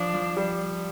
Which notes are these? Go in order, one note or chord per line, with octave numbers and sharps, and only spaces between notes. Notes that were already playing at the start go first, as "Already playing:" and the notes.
Already playing: F3 D4
F3
G3